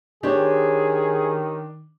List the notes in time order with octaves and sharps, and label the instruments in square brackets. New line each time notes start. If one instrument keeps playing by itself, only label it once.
[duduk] D#3 [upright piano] D4 [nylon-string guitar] G4 C5 C#5 [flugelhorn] G#4